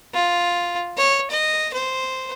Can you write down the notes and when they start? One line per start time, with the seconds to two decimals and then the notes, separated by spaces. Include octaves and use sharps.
0.13 F4
0.97 C#5
1.30 D#5
1.73 C5